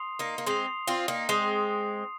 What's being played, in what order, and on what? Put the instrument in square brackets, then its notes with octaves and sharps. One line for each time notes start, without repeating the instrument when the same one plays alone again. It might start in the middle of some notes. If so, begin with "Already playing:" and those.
Already playing: [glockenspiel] C6 D#6 C7 F7
[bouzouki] A#3 D#4
A#3
[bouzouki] G#3 C4 [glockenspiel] C6 D#6 C7 F7
[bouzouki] C4 F4
A#3 D#4
[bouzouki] G#3 C4 [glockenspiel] C6 D#6 C7 F7